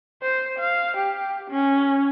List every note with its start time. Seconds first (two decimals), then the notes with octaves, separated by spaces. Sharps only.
0.22 C5
0.59 F5
0.97 G4
1.50 C#4